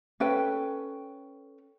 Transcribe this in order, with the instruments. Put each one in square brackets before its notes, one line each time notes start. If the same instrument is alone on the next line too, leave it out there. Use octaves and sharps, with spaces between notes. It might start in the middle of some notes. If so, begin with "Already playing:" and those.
[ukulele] C#4 A4 B4 G5